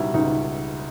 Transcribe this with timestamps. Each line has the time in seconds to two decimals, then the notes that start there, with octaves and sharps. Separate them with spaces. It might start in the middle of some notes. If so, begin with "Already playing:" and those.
Already playing: C#2 B2 G3 D#4 E4
0.14 C#2 D#4